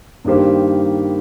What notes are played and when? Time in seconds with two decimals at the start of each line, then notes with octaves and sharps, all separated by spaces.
0.24 G2 D#3 A#3 G4 C5